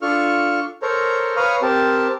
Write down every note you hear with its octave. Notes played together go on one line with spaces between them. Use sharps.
D4 F4 A4 C#6 F6
A4 A#4 C5 C#5 A#5
B4 C#5 F5 A#5 D#6 F6
C4 G4 A#4 A5